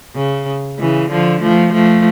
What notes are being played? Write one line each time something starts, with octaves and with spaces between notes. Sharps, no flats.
C#3
C#3 E3
D3 F3
F3 A3
F3 A3